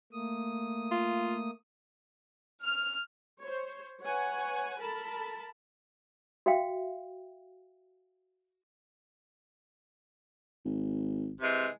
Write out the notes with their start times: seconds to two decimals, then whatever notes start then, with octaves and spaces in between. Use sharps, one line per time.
0.12 A3 A#3 D#6
0.91 F4
2.62 F6
3.40 C5 C#5
4.01 B4 C#5 F#5 G#5
4.80 A4 A#4 A5 B5
6.46 F#4 E5 F5 G5
10.65 G#1
11.41 C3 E3 G#3